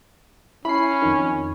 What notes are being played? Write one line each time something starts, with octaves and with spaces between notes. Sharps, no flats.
C#4 E4 B5 C7
F2 D#3